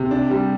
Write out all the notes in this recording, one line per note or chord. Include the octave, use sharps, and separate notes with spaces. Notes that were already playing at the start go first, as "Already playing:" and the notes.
Already playing: C3
D4
G3